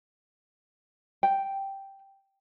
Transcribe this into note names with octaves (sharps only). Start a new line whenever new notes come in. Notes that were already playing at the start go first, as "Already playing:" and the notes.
G5